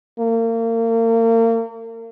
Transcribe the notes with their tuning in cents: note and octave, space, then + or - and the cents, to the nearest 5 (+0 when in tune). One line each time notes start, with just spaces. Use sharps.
A#3 -35